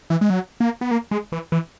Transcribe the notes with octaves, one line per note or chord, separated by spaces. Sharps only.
E3
G#3
F#3
A#3
B3
A#3
G#3
E3
E3